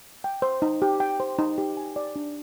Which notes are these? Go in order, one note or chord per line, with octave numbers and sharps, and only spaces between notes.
G5
C5
D#4
G4
G5
C5
D#4
G4
G#5
D5
D4